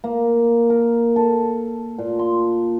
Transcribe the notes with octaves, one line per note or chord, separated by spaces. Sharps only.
A#3
A#4
A4
A#2
C6